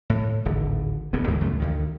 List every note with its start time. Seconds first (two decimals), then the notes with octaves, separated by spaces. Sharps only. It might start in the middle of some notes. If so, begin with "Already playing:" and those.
0.10 A2
0.45 D1 G#1 D3
1.13 D1 E2 A2 B3
1.28 D2 G#2 E3 G#3
1.40 C#2 F#2 C#3 A3
1.60 D2 D#3